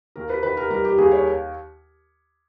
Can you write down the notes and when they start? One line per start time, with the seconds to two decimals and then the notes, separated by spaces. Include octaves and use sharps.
0.16 D#2 A#4
0.30 B4
0.43 D#3 B4
0.57 A#4
0.70 G3 A#4
0.84 G4
0.98 D#2 G#4
1.12 C#5